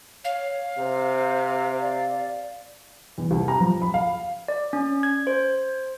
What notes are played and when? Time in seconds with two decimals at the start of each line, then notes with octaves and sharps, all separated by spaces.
0.25 C#5 F5
0.78 C3 C5
1.81 D5
3.18 E2
3.31 C2
3.48 A#5
3.60 F3
3.82 B5
3.94 F5
4.48 D5
4.73 C#4
5.03 G#6
5.27 C5